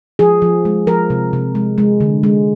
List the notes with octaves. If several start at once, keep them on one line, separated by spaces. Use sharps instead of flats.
F3 G#4
F3
G#3
F3 A#4
C3
C3
G#3
G#3
D3
G#3